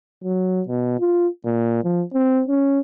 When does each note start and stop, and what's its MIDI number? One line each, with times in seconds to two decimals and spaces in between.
0.24 0.62 54
0.68 0.95 47
1.00 1.28 65
1.46 1.81 46
1.84 2.03 53
2.14 2.43 60
2.48 2.80 61